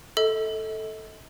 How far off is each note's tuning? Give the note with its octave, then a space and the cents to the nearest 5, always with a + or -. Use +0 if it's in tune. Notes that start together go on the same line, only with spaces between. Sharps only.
A4 +0 D#5 +40